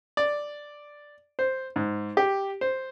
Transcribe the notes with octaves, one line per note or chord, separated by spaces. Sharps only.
D5
C5
G#2
G4
C5